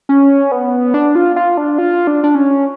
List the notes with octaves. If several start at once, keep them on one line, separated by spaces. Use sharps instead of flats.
C#4
B3
D4
F4
F4
D4
F4
D4
D4
C#4